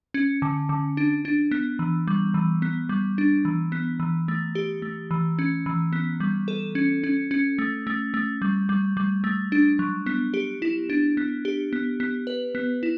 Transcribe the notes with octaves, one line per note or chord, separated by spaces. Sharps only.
C#4
D3
D3
D4
D4
B3
E3
G3
E3
B3
G3
D4
E3
B3
E3
A3
G4
A3
E3
C#4
E3
B3
G3
A4
C#4
C#4
C#4
A3
A3
A3
G3
G3
G3
A3
D4
F#3
B3
G4
E4
D4
B3
G4
B3
B3
B4
B3
E4